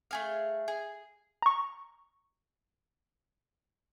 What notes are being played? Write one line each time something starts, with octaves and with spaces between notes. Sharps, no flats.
A3 G#4 F5
G#4
A#5 C#6